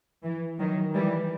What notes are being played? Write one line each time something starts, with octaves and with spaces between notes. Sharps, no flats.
E3
D#3 F#3
E3 G3